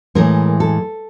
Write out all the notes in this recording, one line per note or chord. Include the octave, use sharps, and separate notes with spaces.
A2 E3 G#3 A#4
A4